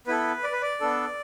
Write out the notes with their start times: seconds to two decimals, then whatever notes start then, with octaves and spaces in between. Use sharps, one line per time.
0.07 B3 E4 A4 B4
0.44 D5
0.52 B4
0.62 D5
0.81 B3 D4 A4